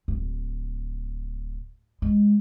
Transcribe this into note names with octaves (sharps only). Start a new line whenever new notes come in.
D1
G#3